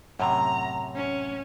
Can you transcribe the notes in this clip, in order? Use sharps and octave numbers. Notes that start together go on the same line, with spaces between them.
F#2 A2 C3 A#5
C#4